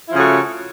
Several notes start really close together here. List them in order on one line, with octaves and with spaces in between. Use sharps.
E4 F3 C#3 A3 F#4